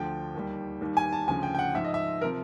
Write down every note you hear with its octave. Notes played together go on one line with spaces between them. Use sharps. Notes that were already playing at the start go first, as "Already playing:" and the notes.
Already playing: D2 D3 F3 G5
D#2 D#3 G3
D#2 D#3 G3
G#5
A5
D2 C#3 F3 G#5
G5
G5
F#5
G#2 F3 E5
D#5
E5
C3 F3 A#4